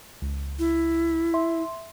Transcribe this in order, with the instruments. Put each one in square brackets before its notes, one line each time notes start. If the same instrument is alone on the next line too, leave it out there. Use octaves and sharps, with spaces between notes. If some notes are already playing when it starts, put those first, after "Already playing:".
[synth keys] C#2
[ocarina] E4
[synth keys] E5 C6